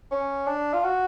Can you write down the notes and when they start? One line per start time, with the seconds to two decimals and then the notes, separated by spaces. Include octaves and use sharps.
0.11 C#4
0.47 D4
0.73 F4
0.83 F#4